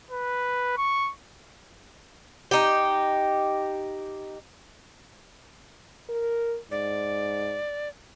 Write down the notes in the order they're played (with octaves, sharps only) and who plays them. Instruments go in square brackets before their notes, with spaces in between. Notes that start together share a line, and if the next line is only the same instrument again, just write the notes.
[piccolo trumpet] B4
C#6
[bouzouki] D#4 G4
[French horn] A#4
[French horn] G#2 [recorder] D5